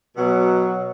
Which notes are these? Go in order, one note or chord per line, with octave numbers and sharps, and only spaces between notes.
B2 F#3